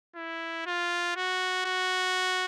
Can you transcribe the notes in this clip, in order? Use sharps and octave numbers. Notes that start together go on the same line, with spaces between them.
E4
F4
F#4
F#4